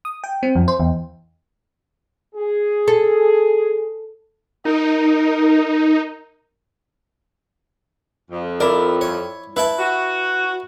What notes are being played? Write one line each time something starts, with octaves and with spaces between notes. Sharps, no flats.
D#6
G5
C4
F2
C5
E2
G#4
A4
D#4 A#4
F2
E4 A#4 D5
C#5
E4 B4 E5 A5
F#4